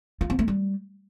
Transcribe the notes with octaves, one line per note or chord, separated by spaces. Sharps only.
F4
C4
A3
G3